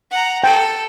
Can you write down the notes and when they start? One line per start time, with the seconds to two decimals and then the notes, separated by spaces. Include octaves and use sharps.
0.11 F#5 A#5
0.44 A4 G5